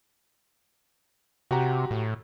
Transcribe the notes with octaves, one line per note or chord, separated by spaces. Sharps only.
C3 F#4 G4 A#5
A2